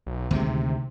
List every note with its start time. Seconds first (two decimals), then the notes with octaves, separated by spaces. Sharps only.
0.07 B1
0.31 D2 C3 D#3 G#3